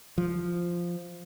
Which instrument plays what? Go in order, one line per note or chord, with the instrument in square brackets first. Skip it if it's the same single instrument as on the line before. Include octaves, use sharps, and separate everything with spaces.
[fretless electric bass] F3